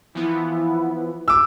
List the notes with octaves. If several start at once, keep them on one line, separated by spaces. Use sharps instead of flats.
E3 F3 B3 E4
D6 E6